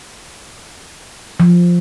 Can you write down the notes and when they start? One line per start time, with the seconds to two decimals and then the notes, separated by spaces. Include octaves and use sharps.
1.40 F3